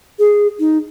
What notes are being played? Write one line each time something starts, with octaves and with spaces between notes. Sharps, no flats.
G#4
D#4